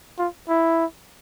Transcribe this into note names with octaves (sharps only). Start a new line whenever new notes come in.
F4
E4